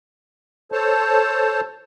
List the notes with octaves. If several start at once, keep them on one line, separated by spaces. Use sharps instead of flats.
A4 C5 C#5 A5